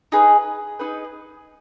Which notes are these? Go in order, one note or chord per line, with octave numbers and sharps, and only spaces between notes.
D#4 G#4 B4
D#4 G#4 B4